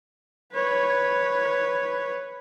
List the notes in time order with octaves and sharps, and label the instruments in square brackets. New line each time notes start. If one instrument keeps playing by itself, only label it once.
[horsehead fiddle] B4 C#5